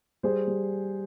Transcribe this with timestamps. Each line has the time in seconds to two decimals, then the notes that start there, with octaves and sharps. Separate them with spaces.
0.23 G3 G#4 C5
0.47 G3